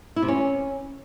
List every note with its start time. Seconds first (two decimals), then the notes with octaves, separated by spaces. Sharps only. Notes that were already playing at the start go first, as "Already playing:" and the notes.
0.16 E4
0.22 C3
0.28 C#4